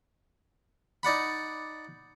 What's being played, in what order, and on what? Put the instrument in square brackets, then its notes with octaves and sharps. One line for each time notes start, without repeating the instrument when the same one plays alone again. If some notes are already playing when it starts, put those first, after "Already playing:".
[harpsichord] D#4 D5 F#5 B5